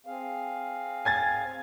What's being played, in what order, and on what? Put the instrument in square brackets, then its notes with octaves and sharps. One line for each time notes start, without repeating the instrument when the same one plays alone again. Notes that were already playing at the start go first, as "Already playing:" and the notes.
[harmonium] C4 G#4 F5
[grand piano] G#5 G#6 A6